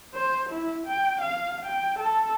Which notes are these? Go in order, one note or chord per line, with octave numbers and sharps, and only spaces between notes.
C5
E4
G5
F5
G5
A4